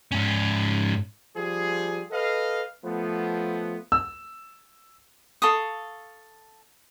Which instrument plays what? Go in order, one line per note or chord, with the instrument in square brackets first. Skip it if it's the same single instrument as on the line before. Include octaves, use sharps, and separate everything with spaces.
[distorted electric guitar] G#2 C#4
[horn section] F3 G3 G#4
A4 B4 D#5 F5
F3 A3 B3
[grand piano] E6
[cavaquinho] A4 F5 C#6 D#6